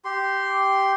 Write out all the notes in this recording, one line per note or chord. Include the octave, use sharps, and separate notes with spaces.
G4 C6